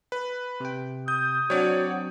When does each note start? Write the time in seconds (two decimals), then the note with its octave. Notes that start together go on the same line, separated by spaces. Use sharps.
0.12 B4
0.60 C3 G5
1.08 D#6 G6
1.50 F#3 C4 D4 F#4 C#5 D5